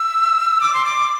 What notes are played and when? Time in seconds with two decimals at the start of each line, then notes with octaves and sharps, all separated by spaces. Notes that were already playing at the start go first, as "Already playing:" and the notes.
Already playing: E6
0.61 D6
0.74 C6
0.85 D6